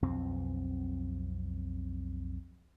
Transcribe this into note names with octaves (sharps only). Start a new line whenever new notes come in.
B1 F2 C4